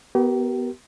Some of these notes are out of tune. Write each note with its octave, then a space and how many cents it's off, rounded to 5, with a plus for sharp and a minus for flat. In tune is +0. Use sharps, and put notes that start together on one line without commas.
B3 +0 G4 -40 A#4 +15